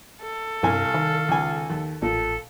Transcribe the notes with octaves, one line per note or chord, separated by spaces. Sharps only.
A4
C2 G2 F5 G#5
D#3
C#2 G#5
D#2
A1 A#2 A4